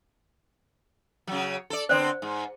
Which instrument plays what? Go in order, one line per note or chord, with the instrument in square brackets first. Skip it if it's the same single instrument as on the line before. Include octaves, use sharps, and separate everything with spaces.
[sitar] C#3 F#3
A4 D5
[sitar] D3 B3 C4 [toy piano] C5 D5
[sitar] G#2